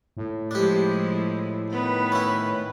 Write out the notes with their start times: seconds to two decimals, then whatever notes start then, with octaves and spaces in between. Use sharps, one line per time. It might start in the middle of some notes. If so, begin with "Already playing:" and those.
0.17 A2
0.51 F3 G#3 D4 E4 G4
1.71 D#3 B3 B4
2.12 C#4 E4